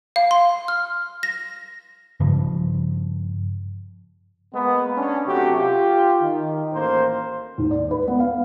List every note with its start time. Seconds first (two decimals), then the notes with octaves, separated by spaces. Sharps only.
0.16 F5
0.31 C6
0.68 F6
1.23 A#6
2.20 G2 C#3 F3
4.54 G#3 A#3 B3
4.97 C#4 D4
5.27 C3 F#3 A3 F#4 G4
5.58 F4 G4
6.22 D#3
6.73 A1 A#3 C5
7.58 D#2
7.71 D5
7.91 B4
8.08 B3
8.20 F5